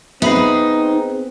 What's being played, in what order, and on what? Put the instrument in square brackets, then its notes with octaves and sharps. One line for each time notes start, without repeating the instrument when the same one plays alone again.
[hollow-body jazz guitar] B3 [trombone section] C4 G#4 [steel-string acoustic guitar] D#4 [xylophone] E5 B5 C7